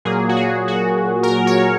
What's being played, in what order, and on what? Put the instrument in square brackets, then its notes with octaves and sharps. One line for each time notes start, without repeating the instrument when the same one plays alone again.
[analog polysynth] A#2 F#3 A#3 G#4
F#4
G#4
F#4
A#4
C#5